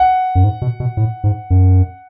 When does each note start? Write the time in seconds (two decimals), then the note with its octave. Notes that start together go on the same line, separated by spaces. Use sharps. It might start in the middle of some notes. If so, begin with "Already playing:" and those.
Already playing: F#5
0.35 F#2
0.44 G#2
0.62 B2
0.80 B2
0.97 A2
1.24 G#2
1.50 F#2